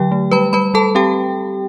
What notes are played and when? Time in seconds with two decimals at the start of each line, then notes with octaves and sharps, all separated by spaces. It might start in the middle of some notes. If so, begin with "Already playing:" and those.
Already playing: D3 F#3 G4 G5
0.12 A3
0.31 G3 B4 B5
0.53 G3 B4 B5
0.74 G3 A4 A5
0.95 C4 G4 G5